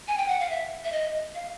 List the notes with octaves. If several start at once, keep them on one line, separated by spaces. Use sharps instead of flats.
G#5
G5
F#5
F5
E5
E5
D#5
F5